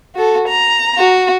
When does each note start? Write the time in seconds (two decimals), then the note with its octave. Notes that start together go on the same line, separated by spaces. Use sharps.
0.15 F#4 A4
0.48 A#5
0.98 F#4